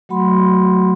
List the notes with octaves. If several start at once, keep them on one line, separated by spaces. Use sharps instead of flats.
F#3 A3 F#4 F#5 B5 C6